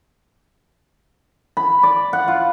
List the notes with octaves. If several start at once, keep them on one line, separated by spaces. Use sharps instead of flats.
B5
D5
F#5
F4